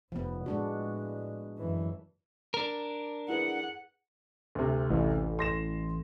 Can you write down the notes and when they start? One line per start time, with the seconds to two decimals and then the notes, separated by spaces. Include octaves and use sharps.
0.12 F1 F3 B3
0.46 A2 G#3 D4 F#4
1.57 F#2 E3
2.54 D4 A#4
3.29 E4 G#4 B4 F#5
4.55 D2 C3
4.90 A1
5.39 C6 A#6 E7